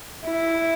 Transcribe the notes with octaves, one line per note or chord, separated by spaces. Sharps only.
E4